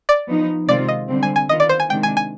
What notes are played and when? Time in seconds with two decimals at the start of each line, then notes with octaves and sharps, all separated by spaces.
0.09 D5
0.28 F3 B3 D#4
0.68 C3 D#3 G#3 C4 F4 D5
0.88 D#5
1.09 D3 G3 C4
1.23 G#5
1.36 G#5
1.49 D#3 B3 F4 D#5
1.60 D5
1.69 C5
1.80 G#5
1.89 C3 D#3 G#3 D4 G5
2.03 G#5
2.17 G#5